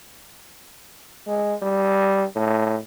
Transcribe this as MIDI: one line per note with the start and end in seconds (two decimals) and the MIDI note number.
1.27 1.54 56
1.62 2.24 55
2.35 2.78 45